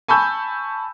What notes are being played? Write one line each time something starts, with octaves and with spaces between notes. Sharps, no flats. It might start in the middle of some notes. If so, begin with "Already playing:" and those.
G#5 A5 B5 C#6 E6 G6